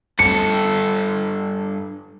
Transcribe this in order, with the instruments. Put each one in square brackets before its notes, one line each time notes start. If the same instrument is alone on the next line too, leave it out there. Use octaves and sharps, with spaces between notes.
[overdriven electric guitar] G2 A4 [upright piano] C#7